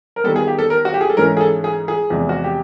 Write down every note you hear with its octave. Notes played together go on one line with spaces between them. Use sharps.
A#4
D#3 G3 B3 A4
G#4
G4
A4
A#4
F#4
G4
G#4
A4
G#2 E3 A3 C#4 A#4
G#4
A4
G#4
G#4
E2 C3 F3 G#3
F#4
G4